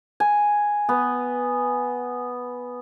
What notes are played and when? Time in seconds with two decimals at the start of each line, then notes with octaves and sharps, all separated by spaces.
0.20 G#5
0.89 B3